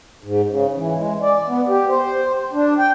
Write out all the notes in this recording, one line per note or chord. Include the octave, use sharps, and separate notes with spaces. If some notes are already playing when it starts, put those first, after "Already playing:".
G#2
C#3
E3
G#3
D5
B3
G4
C5
D4
G5